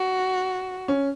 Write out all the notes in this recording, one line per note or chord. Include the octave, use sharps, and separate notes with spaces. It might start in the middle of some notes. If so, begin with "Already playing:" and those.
Already playing: F#4
C#4